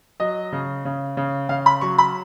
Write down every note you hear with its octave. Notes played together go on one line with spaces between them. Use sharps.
F#3 D#5
C#3
C#3
C#3
C#3 F5
B5
F#3 C#6
B5